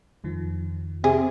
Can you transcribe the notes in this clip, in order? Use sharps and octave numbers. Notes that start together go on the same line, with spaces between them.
F2 D#3 F3
C3 G#4